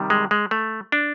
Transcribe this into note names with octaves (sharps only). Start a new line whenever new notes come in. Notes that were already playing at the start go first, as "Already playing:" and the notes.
Already playing: C3 D#3 G3
G#3
G#3
A3
D4